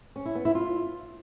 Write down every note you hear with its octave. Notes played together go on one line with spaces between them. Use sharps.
C#4
E4
B3
E4
F4